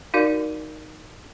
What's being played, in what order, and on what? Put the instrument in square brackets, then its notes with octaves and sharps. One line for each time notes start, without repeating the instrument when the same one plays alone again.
[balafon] D#4 F#4 A#4 D5 F5